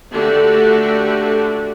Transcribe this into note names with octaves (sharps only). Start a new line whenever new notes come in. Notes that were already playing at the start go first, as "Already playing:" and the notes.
D3 A3 F#4 G4